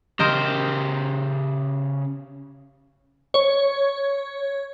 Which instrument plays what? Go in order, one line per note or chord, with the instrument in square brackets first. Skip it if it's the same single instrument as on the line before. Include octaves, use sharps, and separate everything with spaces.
[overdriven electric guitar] C#3 G4 [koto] A#4 C5 D#5
[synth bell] C#5